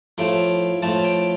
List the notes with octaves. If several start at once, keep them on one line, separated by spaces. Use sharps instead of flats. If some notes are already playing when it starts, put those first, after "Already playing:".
A2 F3 A3 G5
A2 F3 A3 A5
G5